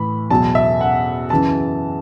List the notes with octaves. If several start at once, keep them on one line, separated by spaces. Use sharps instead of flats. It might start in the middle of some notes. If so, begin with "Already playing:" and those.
Already playing: A2 E3 B5
E2 B2 F#3 A5
E5
F#5
F#2 C#3 E3 A5